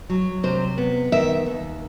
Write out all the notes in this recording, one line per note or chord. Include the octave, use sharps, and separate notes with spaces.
F#3
C3 C5
B3
D#3 E5
D#2